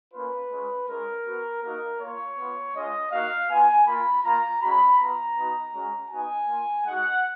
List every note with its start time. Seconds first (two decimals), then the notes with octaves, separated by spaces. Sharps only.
0.13 A#3 C#4 F4 B4
0.51 G#3 C#4 F4
0.89 G#3 C#4 F4 A#4
1.26 B3 F#4
1.63 A#3 D#4 F#4 A#4
2.00 A#3 F4 C#5
2.38 B3 F4
2.75 G#3 C#4 F4 D#5
3.12 A#3 D#4 F#4 F5
3.49 B3 F4 G#5
3.87 A#3 F4 B5
4.24 A#3 F4 A#5
4.61 G#3 C#4 F#4 B5
4.99 B3 F4 A#5
5.36 B3 D#4 F#4
5.73 G#3 C#4 F#4
6.11 B3 D#4 F#4 G#5
6.48 A#3 F4
6.85 G#3 D#4 F#4 F#5